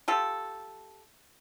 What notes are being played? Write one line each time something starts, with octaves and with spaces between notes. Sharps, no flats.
F4 G4 A4